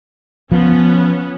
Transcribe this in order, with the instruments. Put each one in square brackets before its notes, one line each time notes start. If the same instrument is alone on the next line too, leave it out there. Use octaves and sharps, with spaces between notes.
[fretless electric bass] F3 [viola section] B3 C#4